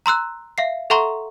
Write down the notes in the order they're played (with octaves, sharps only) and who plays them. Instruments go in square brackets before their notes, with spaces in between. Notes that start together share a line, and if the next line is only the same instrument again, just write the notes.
[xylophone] A#5 C6 E6 F#6
E5 F5 C7
A4 E5 F#5 A#5 C6 C#6